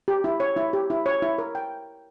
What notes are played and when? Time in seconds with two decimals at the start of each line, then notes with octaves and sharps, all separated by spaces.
0.08 G4
0.24 E4
0.40 C#5
0.57 E4
0.73 G4
0.90 E4
1.06 C#5
1.22 E4
1.38 A#4
1.55 G5